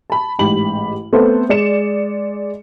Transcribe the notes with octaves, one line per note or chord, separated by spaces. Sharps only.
A5 B5
A1 G#2 G4 B5 F#7
A3 B3 C4 A4 B4 C5
G#3 D5 C#7 E7